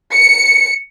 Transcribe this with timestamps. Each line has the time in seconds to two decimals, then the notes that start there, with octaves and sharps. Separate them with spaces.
0.14 C#7